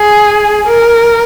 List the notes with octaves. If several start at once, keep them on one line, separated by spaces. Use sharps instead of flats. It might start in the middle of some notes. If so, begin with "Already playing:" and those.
Already playing: G#4
A#4